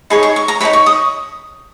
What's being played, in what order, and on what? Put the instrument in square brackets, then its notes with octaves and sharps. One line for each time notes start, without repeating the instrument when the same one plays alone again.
[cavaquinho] D#4 G#4 C#5 B5
C#6
C#6
A#5
D#4 G#4 C#5 B5
C#6
D#6